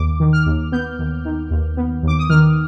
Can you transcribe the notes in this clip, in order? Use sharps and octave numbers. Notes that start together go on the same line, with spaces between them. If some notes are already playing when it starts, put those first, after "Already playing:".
Already playing: D#2 D6
D#3
F6
D#2
B3 G6
D#2
D#3
D#2
B3
D#2 D6
D#6
D#3 F6